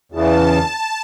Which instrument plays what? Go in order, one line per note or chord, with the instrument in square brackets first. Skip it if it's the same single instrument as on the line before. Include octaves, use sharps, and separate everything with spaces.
[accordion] E2 C#3 E3 [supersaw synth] A5